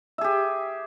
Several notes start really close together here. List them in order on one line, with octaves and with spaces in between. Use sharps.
E5 G#4 G4